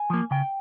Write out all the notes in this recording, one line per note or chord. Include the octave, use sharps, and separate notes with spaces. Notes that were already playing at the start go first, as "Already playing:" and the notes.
Already playing: G#5
F3 A#3
C#3 G5